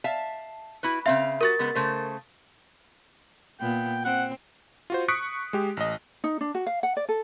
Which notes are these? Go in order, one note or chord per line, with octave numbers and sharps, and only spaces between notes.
E5 F5 A5
E4 F#4 B4
C#3 C4 E5 F5
F#4 G4 A#4 A6
C#3 G#3 B3
C#3 A3 C5
A#2 B3 G5
C4 F#5
F4 F#4 C5
C#6 D#6 F#6 B6 C#7 D7
G#3 G4
A1 D#5
D#4
D4
F#4
F5
F#5
D5
A4